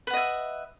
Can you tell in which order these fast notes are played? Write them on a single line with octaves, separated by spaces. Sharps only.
B4 F#5 D#5 E5